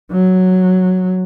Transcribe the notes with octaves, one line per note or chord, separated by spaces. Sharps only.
F#3